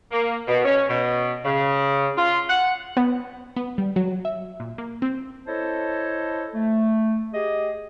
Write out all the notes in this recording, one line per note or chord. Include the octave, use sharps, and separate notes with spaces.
A#3
B2
C#4
B2
C#3
F4
F#5
B3
B3
G3
F#3
E5
A#2
A#3
C4
E4 A4 C5 C#5 D#5 A5
A3
G4 G#4 D#5